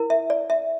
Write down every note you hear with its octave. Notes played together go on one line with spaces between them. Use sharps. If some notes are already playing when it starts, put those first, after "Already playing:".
Already playing: E4 A#4
E5
D5
E5